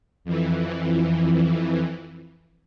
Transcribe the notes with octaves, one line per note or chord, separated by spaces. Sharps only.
F2 E3